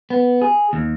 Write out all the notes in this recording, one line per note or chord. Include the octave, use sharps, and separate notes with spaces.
B3
G#4
D#2